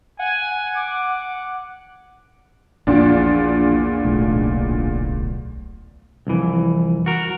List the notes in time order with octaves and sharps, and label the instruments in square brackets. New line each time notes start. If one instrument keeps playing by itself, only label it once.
[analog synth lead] F#5 [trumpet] G#5
[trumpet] D6
[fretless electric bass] A#1 [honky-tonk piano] E2 A#2 D4
[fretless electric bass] D1 B1 A3
[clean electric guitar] C2 F2 E3
F#4 A#4